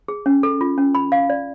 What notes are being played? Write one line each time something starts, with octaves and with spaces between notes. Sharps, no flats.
G#4
C#4
A4
F4
C#4
B5
F5
D5